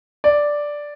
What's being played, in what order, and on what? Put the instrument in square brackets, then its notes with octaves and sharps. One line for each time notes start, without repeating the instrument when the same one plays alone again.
[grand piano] D5